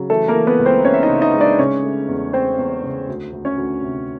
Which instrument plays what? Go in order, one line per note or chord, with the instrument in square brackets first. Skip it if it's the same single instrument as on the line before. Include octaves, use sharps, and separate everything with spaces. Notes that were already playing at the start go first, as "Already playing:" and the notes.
Already playing: [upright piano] C#3 F#3
E3 A3 A4
A#3 A#4
E3
B3 B4
C#2
C4 C5
E3 C#4 C#5
E5
D#4 D#5
C#3
D#4 D#5
G#3
D4 D5
C#3 C#4 C#5
A3
E2
A3 C4 C5
E2
C#3
D2
D2
C#4 C#5
D2
C3